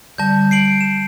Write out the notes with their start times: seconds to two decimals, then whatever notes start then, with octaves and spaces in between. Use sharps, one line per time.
0.18 D3 G3 A5 G6
0.51 C7 D7 F#7
0.81 E7